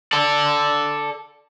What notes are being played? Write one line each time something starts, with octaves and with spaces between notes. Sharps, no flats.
A4 D5